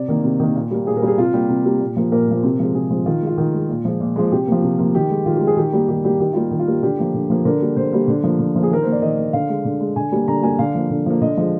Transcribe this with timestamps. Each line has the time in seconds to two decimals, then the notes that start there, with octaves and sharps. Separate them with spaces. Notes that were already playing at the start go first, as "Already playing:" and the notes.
Already playing: C3 D5
0.08 D#3 A#3
0.24 C3
0.40 D#3 A#3
0.55 A#2
0.71 G3 A#3
0.87 A#2 G#4
0.97 A#4
1.02 G3 A#3 G#4
1.18 C3 F4
1.33 G3 A#3 G4
1.49 C3
1.65 G3 A#3
1.81 A#2
1.96 F3 A#3
2.12 A#2 A#4
2.28 F3 A#3
2.43 C3
2.59 F3 G#3
2.75 C3 G#4
2.90 F3 G#3
3.06 D#3 F4
3.22 G#3
3.27 F4
3.38 D#3
3.54 G#3
3.69 A#2
3.85 F3 G#3
4.00 A#2
4.16 F3 G#3
4.32 C3 G4
4.47 F3 A#3
4.63 C3
4.79 F3 A#3
4.95 D#3 G4
5.10 G#3
5.26 D#3 F4
5.36 G4
5.41 G#3
5.47 G#4
5.57 D#3 G4
5.73 G3 A#3
5.88 D#3 G4
6.04 G3 A#3 G4
6.20 D#3 G4
6.33 G3 A#3 F4
6.51 D#3
6.59 F4
6.67 G3 A#3
6.83 D3 G4
6.98 F3 A#3
7.14 D3
7.30 F3 A#3
7.45 D3 A#4
7.61 G3 A#3
7.76 D3 C5
7.93 G3 A#3
8.08 D3
8.24 F3 A#3
8.39 D3
8.56 F3 A#3
8.63 G#4
8.71 D#3 A#4
8.82 A#3 C5
8.92 D5
9.02 D#3 D#5
9.18 A#3
9.33 D3 F5
9.49 G#3
9.65 D3
9.81 G#3
9.96 D3 G#5
10.12 G3 A#3
10.28 D3 A#5
10.43 G3 A#3 G#5
10.59 D3 F5
10.75 F3 A#3
10.90 D3
11.06 F3 A#3
11.22 D3 D#5
11.37 F3 G#3